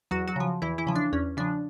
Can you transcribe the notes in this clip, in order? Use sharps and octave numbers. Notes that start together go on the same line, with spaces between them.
E2 F#3 F#4
F#3 F#4
C#3 F3
E2 E3 E4
E3 E4
C#3 F3
D4
E2 C#4
C#3 F3 D4